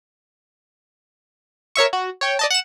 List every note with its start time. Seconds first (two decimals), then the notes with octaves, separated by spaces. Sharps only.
1.76 A#4 C#5 E5 C#6
1.93 F#4
2.21 C#5 G5
2.39 D5 D#5 A5
2.50 F#5 E7